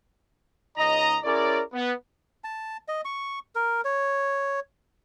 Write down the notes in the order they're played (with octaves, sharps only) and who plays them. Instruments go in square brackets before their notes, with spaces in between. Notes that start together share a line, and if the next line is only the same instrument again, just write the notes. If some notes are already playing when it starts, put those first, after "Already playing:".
[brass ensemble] C#2 D#4 D#5 A#5
C#4 E4 G#4 A#4 C#5 D5
B3
[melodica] A5
D#5
C#6
A#4
C#5